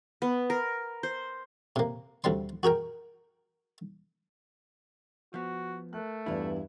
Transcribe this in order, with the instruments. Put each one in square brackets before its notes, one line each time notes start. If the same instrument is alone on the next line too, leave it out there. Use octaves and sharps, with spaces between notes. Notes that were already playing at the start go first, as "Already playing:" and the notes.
[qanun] B3
A#4
C5
[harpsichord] C3 A#3
D2 G3 C4 C6
F#4 G#4 A#4 G5
[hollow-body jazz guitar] F3 B3 [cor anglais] F#4
[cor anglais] A3 [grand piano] A#4 F#6
[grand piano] E2 D5 [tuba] G2 [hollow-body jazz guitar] E4 F4